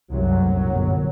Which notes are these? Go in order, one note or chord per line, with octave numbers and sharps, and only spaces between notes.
C2 F#2 C3 F#3
A#1 A2
G1 F#2